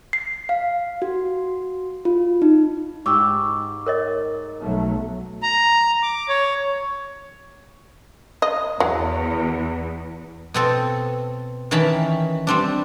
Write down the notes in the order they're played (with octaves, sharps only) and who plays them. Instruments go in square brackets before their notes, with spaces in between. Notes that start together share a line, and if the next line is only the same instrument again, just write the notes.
[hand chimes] C7
F5
F#4
F4
D#4
[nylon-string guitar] G#2 G4 [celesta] C#6 D6 E6
[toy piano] A#4 C#5 D#5
[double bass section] B1 F#3 A3
[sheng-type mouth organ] A#5
D6
C#5
[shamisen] D#5
[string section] E2 [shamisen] F#3
[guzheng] B2 C4 A4
D#3 E3 C#4 G5 A5 B5
G3 C4 D4